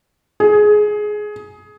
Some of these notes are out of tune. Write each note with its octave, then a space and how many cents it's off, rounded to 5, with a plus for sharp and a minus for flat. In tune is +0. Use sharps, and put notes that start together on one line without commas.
G#4 +15